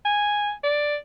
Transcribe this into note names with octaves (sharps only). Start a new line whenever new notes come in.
G#5
D5